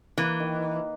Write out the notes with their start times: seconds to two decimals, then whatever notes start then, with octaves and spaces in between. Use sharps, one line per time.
0.18 E3 A#3
0.40 D#3